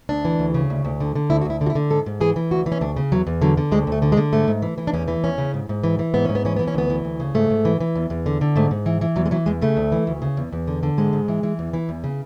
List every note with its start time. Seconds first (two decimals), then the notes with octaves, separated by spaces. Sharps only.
0.09 D2 D4
0.25 E3
0.39 D2
0.54 C#3
0.70 D2
0.85 D2
1.00 D3
1.15 D3
1.30 D2 E4
1.41 F#4
1.45 D2 E4
1.61 D3
1.66 F#4
1.70 E4
1.75 D3
1.90 G#2 A4
2.06 G#2
2.21 E3 G#4
2.36 E3
2.51 D2 F#4
2.66 E3
2.72 C#4
2.81 D2 D4
2.97 C#3
3.12 E2 F#3
3.27 E2
3.42 D3 F#3
3.57 D3
3.71 D2 G#3
3.87 D2 A3
4.02 D3
4.12 G#3
4.17 D3
4.33 G#2 A3
4.48 G#2
4.62 E3
4.78 E3
4.87 D4
4.93 E2 C#4
5.08 E3
5.24 E2 C#4
5.38 C#3
5.54 G#2
5.69 G#2
5.84 E3
5.99 E3
6.14 G#2 B3
6.25 G#2 C#4
6.35 B3
6.45 E3 C#4
6.56 E3 B3
6.67 C#4
6.74 D2 B3
6.90 E3
7.04 D2
7.20 C#3
7.35 G#2 A3
7.50 G#2
7.65 E3
7.80 E3
7.95 E2
8.10 E2
8.26 D3
8.41 D3
8.56 G#2 A3
8.71 G#2
8.86 E3
9.01 E3
9.16 E2 F#3
9.26 G#3
9.31 E3 F#3
9.46 E2 G#3
9.62 C#3 A3
9.77 D2
9.92 E3
10.07 D2
10.22 C#3
10.37 E2
10.52 E2
10.67 D3
10.83 D3
10.98 G#2 G#3
11.13 G#2
11.28 E3
11.43 E3
11.59 E2
11.73 E3
11.89 E2
12.04 C#3